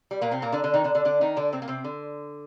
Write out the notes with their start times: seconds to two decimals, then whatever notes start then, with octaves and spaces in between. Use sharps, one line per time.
0.11 G3
0.22 A#2 A#3
0.31 C3 C4
0.42 A#2 A#3
0.52 D3 D4
0.64 D3 D4
0.74 D#3 D#4
0.84 D3 D4
0.95 D3 D4
1.05 D3 D4
1.21 D#3 D#4
1.36 D3 D4
1.53 C3 C4
1.62 A#3
1.68 C3 C4
1.84 D3